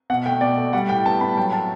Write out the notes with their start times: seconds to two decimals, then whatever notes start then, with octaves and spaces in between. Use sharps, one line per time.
0.10 B2 F#5
0.26 A3 G5
0.41 B2 D5
0.58 A3
0.73 G3 F#5
0.89 A2 G5
1.05 B3 A5
1.21 B3 B5
1.37 F#3 G5
1.53 A3 A5